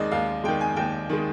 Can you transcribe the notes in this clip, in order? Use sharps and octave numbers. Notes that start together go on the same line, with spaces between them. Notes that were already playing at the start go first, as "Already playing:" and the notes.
Already playing: D#2 D#3 G#3 D5 D#5
D#2 F5
D#3 G#3 G5
G#5
D#2 G5
D#3 G#3